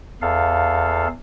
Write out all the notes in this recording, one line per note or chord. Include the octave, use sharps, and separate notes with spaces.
E2 A4 F5